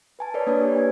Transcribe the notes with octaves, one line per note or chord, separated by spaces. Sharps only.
B4 G#5 A5
A#4 B4 C#5 D5
A#3 D4 B4 C#5 D5
G4 A#4 B4
G#5 G#6